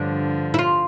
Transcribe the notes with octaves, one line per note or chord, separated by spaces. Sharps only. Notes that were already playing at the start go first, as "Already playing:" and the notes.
Already playing: G2 D3 F3 D4
E4
F4